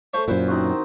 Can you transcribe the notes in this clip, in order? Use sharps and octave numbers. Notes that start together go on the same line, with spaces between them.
A3 C5 C#5
F#2 A#2 E4 B4 C5
D#3 C4 F#4